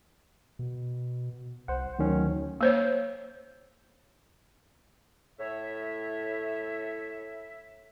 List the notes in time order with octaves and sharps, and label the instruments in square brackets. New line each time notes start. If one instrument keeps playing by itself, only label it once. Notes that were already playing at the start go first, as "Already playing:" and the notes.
[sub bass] B2
[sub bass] C2 [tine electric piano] C5 F#5
[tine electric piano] D2 D#3 C#4 [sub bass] F#3
[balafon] A#3 C5 C#5
[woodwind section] A2 C#5 E5